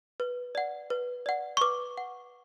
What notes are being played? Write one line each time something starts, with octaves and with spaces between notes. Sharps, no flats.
B4
D5 F#5
B4
D5 F#5
C#6
B4 D6
F#5